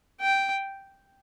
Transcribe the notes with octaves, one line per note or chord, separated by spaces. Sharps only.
G5